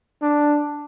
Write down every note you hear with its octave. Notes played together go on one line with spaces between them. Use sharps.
D4